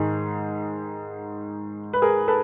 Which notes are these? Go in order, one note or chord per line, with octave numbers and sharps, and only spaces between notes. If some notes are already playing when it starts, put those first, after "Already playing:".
Already playing: G#2 D#3 G#4
B4
G#4 A#4
A4 B4